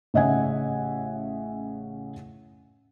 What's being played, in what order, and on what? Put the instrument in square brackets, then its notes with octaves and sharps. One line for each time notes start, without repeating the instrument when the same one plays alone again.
[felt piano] A1 C#3 D#5 E5 F#5 G#5